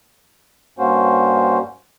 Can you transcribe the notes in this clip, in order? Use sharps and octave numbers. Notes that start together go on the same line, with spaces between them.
G2 A#3 C#4 F#4 C5